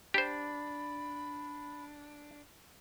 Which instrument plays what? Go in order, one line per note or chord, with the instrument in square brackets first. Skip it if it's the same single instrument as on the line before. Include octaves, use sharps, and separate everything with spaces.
[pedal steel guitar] D4 [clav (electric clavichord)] G4 C5 [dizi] B5